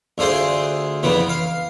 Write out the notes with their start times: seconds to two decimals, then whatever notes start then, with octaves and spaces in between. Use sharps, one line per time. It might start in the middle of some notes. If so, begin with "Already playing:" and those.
0.18 D2 D3 F4 G#4 C5
1.03 F2 C#3 E3 B3
1.29 F5